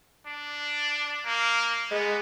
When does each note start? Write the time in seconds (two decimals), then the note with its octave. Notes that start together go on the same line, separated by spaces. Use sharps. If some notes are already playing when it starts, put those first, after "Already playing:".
0.27 D4
1.26 A#3
1.91 G#3 B3